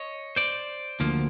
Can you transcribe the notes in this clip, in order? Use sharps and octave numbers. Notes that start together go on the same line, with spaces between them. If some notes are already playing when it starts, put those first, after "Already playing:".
Already playing: C#5 D#5
C5 D5
D2 D3 F3 A#3